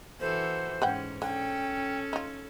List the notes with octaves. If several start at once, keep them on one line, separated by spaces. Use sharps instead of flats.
E3 F#4 A4 C5
G#2 C#4 B4 F#5 G5
D3 C#4 A4 G5
D#4 F4